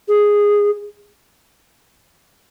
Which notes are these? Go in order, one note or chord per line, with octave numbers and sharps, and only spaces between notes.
G#4